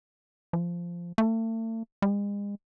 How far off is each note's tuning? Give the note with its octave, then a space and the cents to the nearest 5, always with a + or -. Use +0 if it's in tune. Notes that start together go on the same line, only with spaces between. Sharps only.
F3 -10
A3 +40
G#3 -40